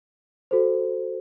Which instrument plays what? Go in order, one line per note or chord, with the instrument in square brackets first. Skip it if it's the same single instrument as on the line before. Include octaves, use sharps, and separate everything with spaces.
[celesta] F#4 A4 C5